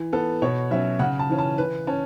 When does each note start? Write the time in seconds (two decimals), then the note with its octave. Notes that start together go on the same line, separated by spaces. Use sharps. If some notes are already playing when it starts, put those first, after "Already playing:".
Already playing: E3
0.13 B3 A4
0.42 B2 C#5
0.71 F#3 C#4 E5
0.99 C#3 F#5
1.19 A5
1.29 E3 C#4
1.39 A5
1.58 E3 B4
1.87 C#4 A5